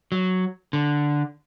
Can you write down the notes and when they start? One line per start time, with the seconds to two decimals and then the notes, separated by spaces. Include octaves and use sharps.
0.12 F#3
0.73 D3